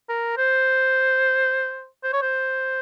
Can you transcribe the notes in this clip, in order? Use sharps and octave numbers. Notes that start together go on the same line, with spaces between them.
A#4
C5
C5
C#5
C5